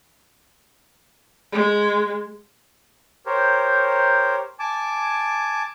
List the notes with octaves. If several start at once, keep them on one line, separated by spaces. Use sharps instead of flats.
G#3
G4 A#4 C5 C#5
G#5 A5 D6